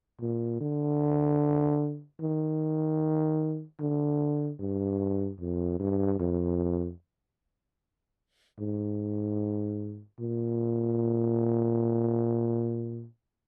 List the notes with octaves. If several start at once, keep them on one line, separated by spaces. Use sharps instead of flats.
A#2
D3
D#3
D3
G2
F2
G2
F2
G#2
A#2